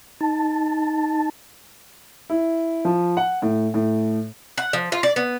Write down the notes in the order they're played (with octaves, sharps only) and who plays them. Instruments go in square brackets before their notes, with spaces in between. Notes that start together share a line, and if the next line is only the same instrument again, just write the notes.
[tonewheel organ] D#4 A5
[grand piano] E4
F3
F#5
A2
A2
[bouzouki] F#5
F3
F4
D5
B3